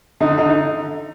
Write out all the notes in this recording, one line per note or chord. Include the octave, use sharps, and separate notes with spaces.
D3 D#4
D3 D#4
D#4